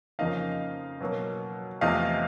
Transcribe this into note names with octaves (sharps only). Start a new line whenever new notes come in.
F2 C#3 F3 A#3 D#4 D#5 F5
B2 F#3 A#3
E2 C3 F3 A3 D#5 F5